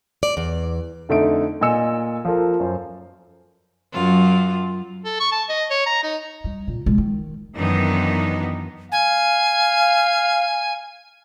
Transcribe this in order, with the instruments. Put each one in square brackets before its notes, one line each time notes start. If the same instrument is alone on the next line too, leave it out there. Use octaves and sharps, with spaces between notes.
[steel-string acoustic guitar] D5
E2
[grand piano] F2 D3 A3 D#4 E5 D7
A#2 D#5 G#5 E6 C#7 E7
F3 F4 A4 A#4
F#2 C5
[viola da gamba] F#2 F4
[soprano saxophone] A4
C#6
A5
D#5
C#5
A#5
D#4
[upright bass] G3
A#2
B2 G#3
D#3
[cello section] F#2 D#3 E3 B3 D4 D#4
[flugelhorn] F5 [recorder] G#5